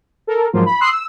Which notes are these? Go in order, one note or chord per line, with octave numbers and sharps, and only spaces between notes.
A4 A#4
G#2 F3 F#3 A#3 F4
B5
C6 D#6 E6 F#6 C7
E6